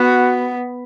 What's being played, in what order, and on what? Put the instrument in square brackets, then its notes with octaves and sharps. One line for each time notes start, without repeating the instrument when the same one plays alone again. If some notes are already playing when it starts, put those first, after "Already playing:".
Already playing: [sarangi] B3 [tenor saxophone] F#4